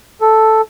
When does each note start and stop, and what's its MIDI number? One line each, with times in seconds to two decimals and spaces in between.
0.21 0.61 69